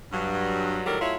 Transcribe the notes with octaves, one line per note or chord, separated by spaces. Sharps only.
G2 F#3
A2 D#3 F#3 G3 A4 A#4
F#3 A3 E4 F4 C#5